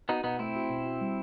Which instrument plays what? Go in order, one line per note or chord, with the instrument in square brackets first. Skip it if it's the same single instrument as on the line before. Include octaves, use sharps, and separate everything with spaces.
[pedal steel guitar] B3 D#4 [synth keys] F#4
[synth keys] B2 [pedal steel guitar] B3 D#4
[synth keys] A3 [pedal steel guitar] C4 E4
[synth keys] F#4
B2
F#4
G3